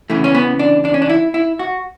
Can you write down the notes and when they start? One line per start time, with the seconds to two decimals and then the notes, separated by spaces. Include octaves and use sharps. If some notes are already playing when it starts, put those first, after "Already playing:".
0.10 E2 C#3 E3 A3
0.24 C#4
0.35 B3
0.59 D4
0.85 D4
0.94 C#4
1.02 D4
1.09 E4
1.34 E4
1.59 F#4